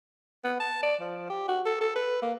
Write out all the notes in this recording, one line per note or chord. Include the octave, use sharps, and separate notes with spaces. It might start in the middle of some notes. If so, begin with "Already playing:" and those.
B3
A5
D5
F3
G4
F#4
A4
A4
B4
A#3